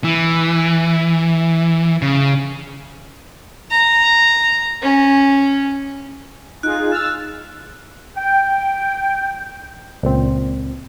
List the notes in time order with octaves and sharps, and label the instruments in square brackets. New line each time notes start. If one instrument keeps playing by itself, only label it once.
[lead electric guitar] E3
C#3
[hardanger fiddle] A#5
C#4
[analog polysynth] D#4 F4 G#4 [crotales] F#6
[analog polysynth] E6 F6 A6
[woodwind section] G5
[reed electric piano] C#2 A#2 C4